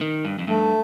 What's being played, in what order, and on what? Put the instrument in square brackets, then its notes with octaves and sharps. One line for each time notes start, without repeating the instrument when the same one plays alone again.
[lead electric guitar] D#3
G2
F2
[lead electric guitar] G2 [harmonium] A3